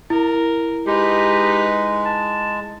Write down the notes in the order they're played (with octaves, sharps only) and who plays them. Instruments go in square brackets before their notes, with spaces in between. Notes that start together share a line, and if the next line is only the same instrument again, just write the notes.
[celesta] E4 [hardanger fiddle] A#4
[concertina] G#3 [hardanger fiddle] D#4 B4 [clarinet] G4
[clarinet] A5